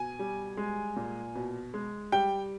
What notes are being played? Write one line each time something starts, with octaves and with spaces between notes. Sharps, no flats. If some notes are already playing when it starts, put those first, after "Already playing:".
Already playing: B2 G#5
G3
G#3
A#2
B2
G#3
G3 G5